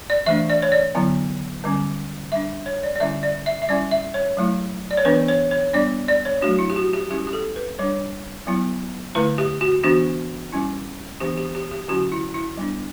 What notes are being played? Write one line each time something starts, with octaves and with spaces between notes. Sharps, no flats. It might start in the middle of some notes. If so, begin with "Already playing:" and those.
D5
E3 A3 D4 E5
D5
C#5
D5
D3 F#3 B3 E4
D3 G3 C#4
G3 D4 E5
C#5
D5
D5
D3 G3 C#4 E4 E5
D5
E5
E5
G3 C#4 E4 D5
E5
C#5
F#3 A3 E4
D5
C#5
E3 B3 D4 B4
C#5
C#5
G3 B3 D4 D5
D5
C#5
F#3 A3 D4 F#4
E4
G4
F#4
G4
G3 C#4 E4 G4
G4
A4
B4
G3 D4 C#5
F#3 B3 E4
D3 A3 E4 B4
G4
F#4
E3 B3 D4 F#4
G3 C#4 E4
E3 B3 D4 G4
G4
G4
G4
D3 F#3 C#4 E4 F#4
E4
E4
G3 B3 D4